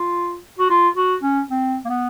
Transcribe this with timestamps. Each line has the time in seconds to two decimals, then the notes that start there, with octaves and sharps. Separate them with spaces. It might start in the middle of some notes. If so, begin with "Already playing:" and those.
Already playing: F4
0.59 F#4
0.70 F4
0.96 F#4
1.23 C#4
1.49 C4
1.85 A#3
1.89 B3